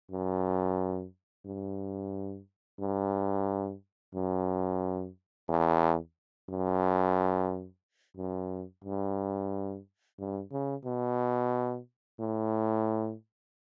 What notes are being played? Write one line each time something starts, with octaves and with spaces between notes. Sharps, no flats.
F#2
G2
G2
F#2
E2
F#2
F#2
G2
G2
C#3
B2
A2